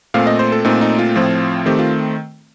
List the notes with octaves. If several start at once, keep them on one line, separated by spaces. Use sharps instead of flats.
A#2 A3 C4 F5
D#5
C5
A4
A#2 A3 C4 D#4
D#4
F4
A2 F3 C4
D#3 A3 C4 G4
F4